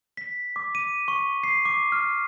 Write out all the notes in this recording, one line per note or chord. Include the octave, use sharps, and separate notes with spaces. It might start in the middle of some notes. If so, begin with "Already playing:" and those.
B6
D6
D#7
C#6
C7
D6
F6